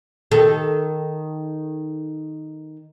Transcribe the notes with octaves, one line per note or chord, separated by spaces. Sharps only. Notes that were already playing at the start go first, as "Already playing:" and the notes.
D#3 A4